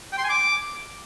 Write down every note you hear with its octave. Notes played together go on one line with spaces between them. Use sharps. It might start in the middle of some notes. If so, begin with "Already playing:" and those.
G5
C6
G#5
D6